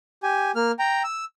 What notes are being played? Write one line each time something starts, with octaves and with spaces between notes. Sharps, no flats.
G4 G#5
A#3 F6
G5 A#5
E6